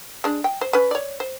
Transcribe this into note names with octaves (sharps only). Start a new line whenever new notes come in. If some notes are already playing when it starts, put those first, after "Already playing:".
G#3 D4
G5
C5
C#4 B4
C#5 D5
C5